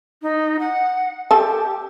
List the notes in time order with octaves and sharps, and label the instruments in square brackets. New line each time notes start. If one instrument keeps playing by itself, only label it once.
[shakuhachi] D#4
F#5
[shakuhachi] G4 [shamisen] A4 A5